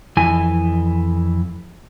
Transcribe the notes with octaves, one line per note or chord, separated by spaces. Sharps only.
F2 E3 G#5